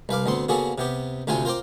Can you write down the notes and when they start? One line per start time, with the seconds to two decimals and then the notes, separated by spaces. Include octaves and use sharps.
0.09 C2 B4 F5 D6
0.26 D2 B3 C4 C6
0.49 C#3 A#3 B3 F#4 G#4 A4
0.78 C3 B3 G4
1.27 D2 C3 C4 F4 G5 G#5
1.45 F4 A#4 C5 G5 D6